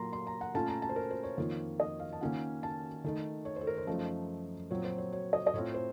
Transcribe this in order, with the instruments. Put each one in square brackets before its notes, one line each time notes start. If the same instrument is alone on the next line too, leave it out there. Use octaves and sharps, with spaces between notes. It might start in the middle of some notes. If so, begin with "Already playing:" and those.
Already playing: [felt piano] A#2 F#3 A#3 A#5 C6
C6
A#5
F#5
A#2 A3 C#4 F4 A5
A#5
A5
C5
A#4
C5
C#5
F2 D#3 A#3 F4
D#5
F5
A5
D#3 A#3 C#4 F4 F#5
A5
D#3 A3 D#4
C#5
A4 C5
A#4
C5
F#2 F3 A3 D#4
A#2 F#3 C4 C#5
C5
C#5
C#5
D#5
D#5
A2 A3 C4 F4 C#5
C5